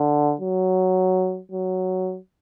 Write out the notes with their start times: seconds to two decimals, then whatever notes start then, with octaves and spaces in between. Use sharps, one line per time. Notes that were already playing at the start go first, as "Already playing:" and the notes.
Already playing: D3
0.41 F#3
1.52 F#3